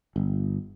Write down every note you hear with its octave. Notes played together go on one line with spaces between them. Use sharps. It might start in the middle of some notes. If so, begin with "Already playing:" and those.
G1